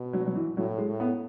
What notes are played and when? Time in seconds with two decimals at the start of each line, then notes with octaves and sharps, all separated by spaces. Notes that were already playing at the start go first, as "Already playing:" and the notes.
Already playing: B2
0.13 F#3
0.27 F#3
0.35 E3
0.57 A2 F#3
0.78 G#3
0.89 A2
1.00 B3